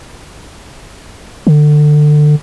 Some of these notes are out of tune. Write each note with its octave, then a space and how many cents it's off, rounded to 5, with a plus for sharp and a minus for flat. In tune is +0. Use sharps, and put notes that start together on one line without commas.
D3 +25